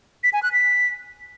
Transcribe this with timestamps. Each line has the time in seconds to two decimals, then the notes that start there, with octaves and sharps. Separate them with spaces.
0.24 B6
0.33 G#5
0.43 F#6
0.52 B6